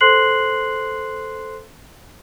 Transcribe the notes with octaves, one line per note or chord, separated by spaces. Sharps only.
A4 C5 C6 F#6 C7 F#7